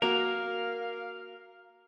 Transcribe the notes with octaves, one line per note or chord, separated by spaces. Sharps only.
A#3 F#4 A#4 F5